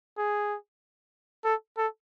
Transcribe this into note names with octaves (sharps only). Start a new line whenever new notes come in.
G#4
A4
A4